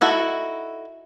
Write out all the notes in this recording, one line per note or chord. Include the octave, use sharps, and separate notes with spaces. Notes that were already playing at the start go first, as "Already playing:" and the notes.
D#4 E4 F#4 A4